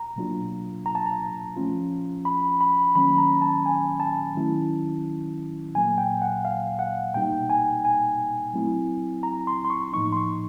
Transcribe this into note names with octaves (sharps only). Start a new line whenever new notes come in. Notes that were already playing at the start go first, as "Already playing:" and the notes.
Already playing: A#5
B2 F#3 A#3 D4 F4
A#5
A5
A#5
F3 A3 C#4 F4
B5
B5
D#3 F#3 A#3 C#4 B5
A#5
A5
G#5
A5
D#3 F#3 A3 C#4 E4
A#2 F#3 A#3 G#5
G5
F#5
F5
F#5
B2 G3 A#3 D#4 G5
G#5
G#5
F#3 A3 C4 E4
A#5
C6
C6
C#6
A2 F3 A#3 D#4 C#6
C6
C#6